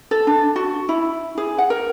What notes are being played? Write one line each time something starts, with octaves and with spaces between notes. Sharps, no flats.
A4
D4
F#4
E4
G#4
F#5
A#4